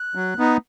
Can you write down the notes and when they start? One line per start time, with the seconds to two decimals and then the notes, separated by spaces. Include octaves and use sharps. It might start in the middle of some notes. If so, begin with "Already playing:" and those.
Already playing: F#6
0.15 F#3
0.39 B3 D#4